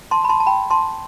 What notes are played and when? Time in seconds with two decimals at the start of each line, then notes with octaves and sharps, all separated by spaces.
0.11 A5 C6
0.24 B5
0.29 A5 C6
0.40 A5
0.47 G5 B5
0.71 A5 C6